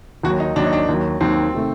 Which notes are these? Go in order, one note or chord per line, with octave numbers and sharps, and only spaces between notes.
D#2 D#3 F#3 F#4
D#4
D#2 D#3 F#3 D4
D#4
D4
D#2 D#3 F#3
D#2 D#3 F#3 C4
C3 D#3 A3